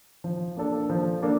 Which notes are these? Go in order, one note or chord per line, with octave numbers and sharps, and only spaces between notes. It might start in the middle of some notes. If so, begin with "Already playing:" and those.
F3
A#3 D4 A4
F3
A#3 D4 A4